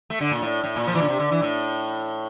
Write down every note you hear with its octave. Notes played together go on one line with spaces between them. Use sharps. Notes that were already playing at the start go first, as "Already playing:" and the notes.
A3
D3
A#2
A2
A2
A#2
F3
E3
D3
C3
D3
E3
A2